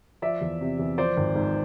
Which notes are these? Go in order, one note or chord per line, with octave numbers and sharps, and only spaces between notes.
F3 D5 E5
E2
C3
E2
F3 C5 D5
G#1
G#2